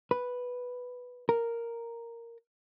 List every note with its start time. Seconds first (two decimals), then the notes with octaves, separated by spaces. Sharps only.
0.11 B4
1.29 A#4